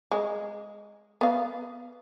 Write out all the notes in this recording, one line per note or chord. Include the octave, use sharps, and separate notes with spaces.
G#3
B3 F5